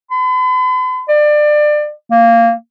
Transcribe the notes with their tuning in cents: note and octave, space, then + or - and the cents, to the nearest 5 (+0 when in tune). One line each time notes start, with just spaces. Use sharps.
B5 +45
D5 +25
A#3 -15